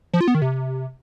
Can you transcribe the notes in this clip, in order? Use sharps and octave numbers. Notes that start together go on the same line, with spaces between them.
F3
F4
B3
D#3
C3